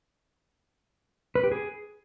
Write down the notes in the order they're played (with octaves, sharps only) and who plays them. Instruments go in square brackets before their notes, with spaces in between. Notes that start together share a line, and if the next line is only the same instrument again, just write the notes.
[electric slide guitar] B4
G4
G#4